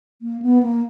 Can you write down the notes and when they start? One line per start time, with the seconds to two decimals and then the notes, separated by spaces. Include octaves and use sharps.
0.22 A#3
0.42 B3
0.63 A#3